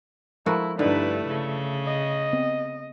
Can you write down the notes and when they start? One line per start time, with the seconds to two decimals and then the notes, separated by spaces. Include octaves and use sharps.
0.46 F3 G#3 A3 E4 F#4 A#4
0.79 G2 D3 A3 D#4 E4 B4
1.28 C#3
1.86 D#5
2.33 B3 C4